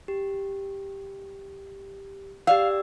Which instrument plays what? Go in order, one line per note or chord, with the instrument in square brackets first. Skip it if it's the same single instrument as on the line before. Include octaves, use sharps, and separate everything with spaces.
[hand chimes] G4
[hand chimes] G4 D5 E6 [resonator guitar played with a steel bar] F5